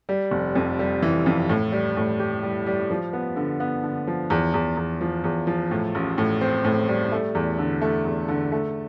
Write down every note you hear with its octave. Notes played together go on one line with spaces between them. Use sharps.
G3
F1
F2
G3
E3
F2
A2
G3
A2
G4
G3
G3
F3
B3
D3
B3
D3
F3
E2
E2
E2
F3
E2
F3
A2
A1
A2
C4
A2
G3
A3
E2
D3
A3
E2
D3
A3